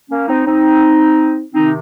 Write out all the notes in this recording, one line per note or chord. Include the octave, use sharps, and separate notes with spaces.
A#3 C#4
C4 D#4
C4 D#4
C3 D#3 C4 D#4